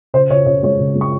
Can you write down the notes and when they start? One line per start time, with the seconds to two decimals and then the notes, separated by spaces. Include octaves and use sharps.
0.14 C#3 C5
0.30 C#3 C#5
0.46 C#3 C#5
0.63 G#3 C#5
0.79 C#3
0.95 G#3
1.01 C#6